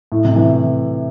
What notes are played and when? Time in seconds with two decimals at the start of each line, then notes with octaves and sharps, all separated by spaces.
0.12 A2
0.25 C3
0.36 E3